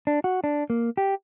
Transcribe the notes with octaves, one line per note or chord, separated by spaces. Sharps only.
D4
F#4
D4
A#3
G4